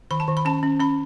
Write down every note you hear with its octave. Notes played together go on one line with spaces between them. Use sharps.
D#3 B5
A5
D#3
B5
C#4 A5
C#4
C#4 B5